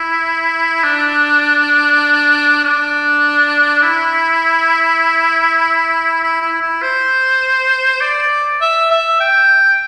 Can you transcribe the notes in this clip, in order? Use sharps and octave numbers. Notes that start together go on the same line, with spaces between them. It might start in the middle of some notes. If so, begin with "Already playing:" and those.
Already playing: E4
D4
D4
E4
E4
E4
E4
C5
D5
E5
E5
G5